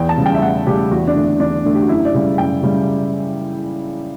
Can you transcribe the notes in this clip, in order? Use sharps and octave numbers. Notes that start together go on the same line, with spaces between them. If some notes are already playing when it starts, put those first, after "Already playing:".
Already playing: E2 G5
A5
C#3 G3
G5
E5
E2 F#5
C#3 G3 G4
E2 F#4
D4
D3 A3
D4
E2 D4
D3 A3
G4
F#4
F#2 E4
D5
C#3 G3
F#2 G5
C#3 G3